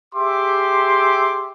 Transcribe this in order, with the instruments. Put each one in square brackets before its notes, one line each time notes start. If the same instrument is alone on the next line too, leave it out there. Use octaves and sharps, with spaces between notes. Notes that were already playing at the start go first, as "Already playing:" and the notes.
[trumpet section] G4 G#4 E5 C6 D6